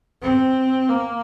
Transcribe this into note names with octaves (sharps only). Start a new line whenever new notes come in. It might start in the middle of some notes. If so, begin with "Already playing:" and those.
C4
A#3